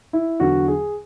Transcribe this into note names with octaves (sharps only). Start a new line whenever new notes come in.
E4
E2 D3 F#3 F#4
G#4